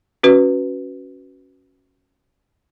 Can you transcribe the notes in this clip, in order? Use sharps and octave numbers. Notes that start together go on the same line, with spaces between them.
C#4 F#4 B4